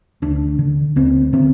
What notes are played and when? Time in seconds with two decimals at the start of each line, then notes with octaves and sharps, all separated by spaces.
0.22 D2 D4
0.59 D3
0.96 D2 C4
1.33 D3 C4